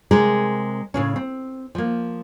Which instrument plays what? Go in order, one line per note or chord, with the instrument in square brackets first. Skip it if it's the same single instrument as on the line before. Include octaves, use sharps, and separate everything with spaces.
[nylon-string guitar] C3 G#3 G#4 A#4
A2 C#3 C#4
C4
F3 A#3